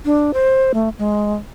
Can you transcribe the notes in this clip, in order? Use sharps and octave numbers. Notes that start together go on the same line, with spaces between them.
D4
C5
A3
G#3